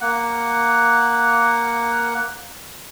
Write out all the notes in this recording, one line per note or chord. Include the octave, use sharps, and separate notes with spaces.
A#3 F#5